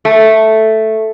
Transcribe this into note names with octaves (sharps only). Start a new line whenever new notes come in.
A3